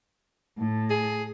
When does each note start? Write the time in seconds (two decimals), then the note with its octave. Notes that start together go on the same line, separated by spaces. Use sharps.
0.58 A2
0.90 G#4